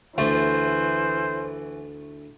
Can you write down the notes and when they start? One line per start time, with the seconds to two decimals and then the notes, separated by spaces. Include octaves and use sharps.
0.18 D2 E3 A3 C5